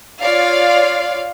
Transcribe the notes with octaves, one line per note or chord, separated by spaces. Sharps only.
F4 C#5 D5 F5